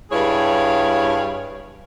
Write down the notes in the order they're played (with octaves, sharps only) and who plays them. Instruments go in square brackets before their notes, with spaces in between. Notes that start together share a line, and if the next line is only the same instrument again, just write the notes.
[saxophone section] G2 G3 E4 G#4 C#5 F5